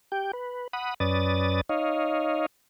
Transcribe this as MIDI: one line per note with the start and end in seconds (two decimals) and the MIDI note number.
0.12 0.31 67
0.12 0.31 79
0.33 0.68 71
0.73 0.94 78
0.73 0.94 83
0.73 0.94 87
1.00 1.61 42
1.00 1.61 61
1.00 1.61 71
1.00 1.61 74
1.00 1.61 87
1.00 1.61 93
1.69 2.46 63
1.69 2.46 73
1.69 2.46 75
1.69 2.46 77